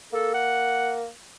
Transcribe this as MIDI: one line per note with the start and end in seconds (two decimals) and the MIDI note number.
0.13 1.07 58
0.13 0.31 69
0.34 0.99 78